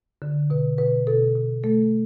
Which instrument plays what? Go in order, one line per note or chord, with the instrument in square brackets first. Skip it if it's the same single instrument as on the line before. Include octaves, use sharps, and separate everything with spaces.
[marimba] D3
B2 B4
B2 B4
B2 A4
B2
A3 A4